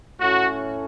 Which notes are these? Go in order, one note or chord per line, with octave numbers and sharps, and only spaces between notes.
A2 A3 C#4 F#4